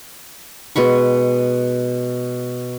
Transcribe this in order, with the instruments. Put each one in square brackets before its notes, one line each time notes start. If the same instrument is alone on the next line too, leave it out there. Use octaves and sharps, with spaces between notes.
[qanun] B2 G#3 B5 C#6